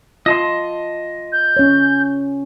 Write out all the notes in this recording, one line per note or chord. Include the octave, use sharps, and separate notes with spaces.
F4 D#5 A5 C6
G6
C#4 C#5